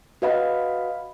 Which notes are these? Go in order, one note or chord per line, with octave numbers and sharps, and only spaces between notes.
F#4 B4 D#5 F5 F#5 B5